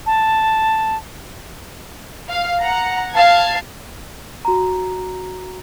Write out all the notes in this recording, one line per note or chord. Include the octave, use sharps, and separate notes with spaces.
A5
F5
F#5 A#5
F5 A5 G#6
F#4 A#5